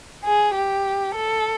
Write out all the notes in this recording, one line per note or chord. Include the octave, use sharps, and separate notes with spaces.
G#4
G4
A4